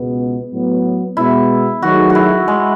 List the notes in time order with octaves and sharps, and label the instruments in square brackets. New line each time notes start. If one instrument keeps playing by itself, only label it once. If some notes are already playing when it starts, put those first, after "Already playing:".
Already playing: [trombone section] C#2 B2 G#3 B3
A2 F#3 B3
[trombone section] B2 G#3 B3 [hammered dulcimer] E4
[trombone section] D#3 F#3 A3 D#4 G#4 [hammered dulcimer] F#4
[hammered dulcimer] F#4
E4
G#3